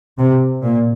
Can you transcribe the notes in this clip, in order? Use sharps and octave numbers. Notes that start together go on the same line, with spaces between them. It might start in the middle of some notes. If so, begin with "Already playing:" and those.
C3
A#2